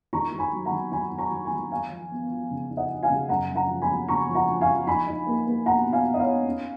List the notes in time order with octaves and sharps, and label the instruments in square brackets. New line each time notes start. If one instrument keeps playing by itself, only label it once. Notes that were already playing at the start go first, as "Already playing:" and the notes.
[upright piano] D#3 A#5 C#6
D#3
G#5 B5
F#3
F#5 A#5
D#3
D#3 G#5 B5
D#3
A#5 C#6
D#3
G#5 B5
D#3
D#4 F5 G#5
F3
B3
F3
C#3
D#4
D#5 F#5
D#4
F5 G#5
C#3
F#2 F#5 A#5
F#2
F#5 A#5
F3
G#5 B5
F3
C#3 A#5 C#6
F3
F#5 A#5
F3
F5 G#5
F3
D#4 G#5 B5
D#4
A#3
A#3
B2 F#5 A#5
B2
F5 G#5
B2
D#5
C#5 F5
D#4
C#4